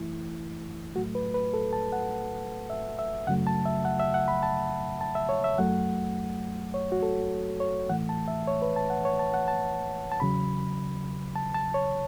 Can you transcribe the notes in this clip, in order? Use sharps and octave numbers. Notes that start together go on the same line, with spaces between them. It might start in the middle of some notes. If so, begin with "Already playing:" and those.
Already playing: F#2 E3 A3 E4
A2 F#3 A3 F#4
B4
B4
A4
A5
F#5
E5
E5
F#2 C#3 F#3 A3 F#5
A5
E5
F#5
E5
F#5
B5
A5
A5
E5
C#5
E5
F#2 F#3 A3 F#5
C#5
F#4
A4
C#5
A2 E3 A3 F#5
A5
E5
C#5
B4
A5
F#5
C#5
A5
F#5
A5
A5
E2 C#3 F#3 B5
A5
A5
C#5